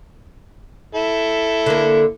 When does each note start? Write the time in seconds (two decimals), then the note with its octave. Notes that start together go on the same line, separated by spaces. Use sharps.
0.95 E4 A4
1.66 D3 A#3